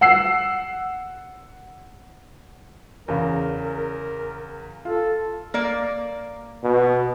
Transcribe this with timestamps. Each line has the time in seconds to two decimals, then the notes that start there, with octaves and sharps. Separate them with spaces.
0.01 F#5 E6 C7
3.08 E2 C#3 A#4
3.63 A#4
4.85 F4 A4
5.54 A#3 D5
6.64 B2